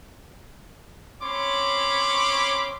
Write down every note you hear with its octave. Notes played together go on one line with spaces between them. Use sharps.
C4 C#4 C#5 B5 C6 D6